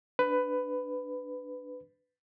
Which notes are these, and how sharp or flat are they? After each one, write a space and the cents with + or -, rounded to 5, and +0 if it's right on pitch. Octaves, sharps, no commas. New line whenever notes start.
D4 +0 B4 +15